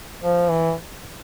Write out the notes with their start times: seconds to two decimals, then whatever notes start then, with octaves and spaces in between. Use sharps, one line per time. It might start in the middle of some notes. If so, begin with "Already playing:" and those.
0.22 F3
0.50 E3